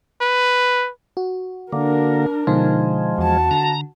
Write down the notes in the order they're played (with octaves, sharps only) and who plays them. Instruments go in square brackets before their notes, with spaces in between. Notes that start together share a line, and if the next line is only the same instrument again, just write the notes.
[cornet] B4
[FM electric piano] F#4
[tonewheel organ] D3 A#3 [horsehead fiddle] D4 A#4
[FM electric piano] B2 D3 D#4 [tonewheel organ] F3 G#3
[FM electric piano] E2 [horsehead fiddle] F#4 A5
[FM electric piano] D3 [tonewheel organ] A#5